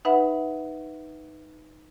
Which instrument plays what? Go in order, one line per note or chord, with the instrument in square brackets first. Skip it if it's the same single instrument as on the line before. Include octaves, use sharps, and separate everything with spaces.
[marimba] D#4 B4 E5 F#5 B5